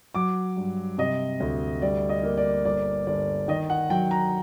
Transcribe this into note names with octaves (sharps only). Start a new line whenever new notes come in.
F#3 D6
G2
C3 D#5
D2
G3 D5
D#5
A#3
D5
G1 D5
G1 D5
D#3 D#5
F#5
F#3 G5
A#5